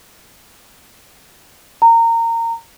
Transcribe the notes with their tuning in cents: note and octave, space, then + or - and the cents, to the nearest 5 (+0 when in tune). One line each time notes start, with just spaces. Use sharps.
A#5 -25